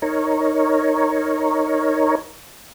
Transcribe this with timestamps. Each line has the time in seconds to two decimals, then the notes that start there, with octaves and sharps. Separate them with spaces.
0.02 D#4 A#4 C#5